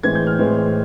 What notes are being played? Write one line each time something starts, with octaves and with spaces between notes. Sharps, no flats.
A2 E3 G#3 C4 G#6
G6
F6
A2 E3 G#3 C4